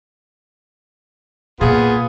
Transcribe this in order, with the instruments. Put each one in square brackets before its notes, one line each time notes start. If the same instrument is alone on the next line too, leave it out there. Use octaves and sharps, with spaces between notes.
[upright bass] A#2 [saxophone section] B3 F4 G#4